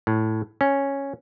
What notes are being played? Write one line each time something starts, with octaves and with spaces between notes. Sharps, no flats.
A2
C#4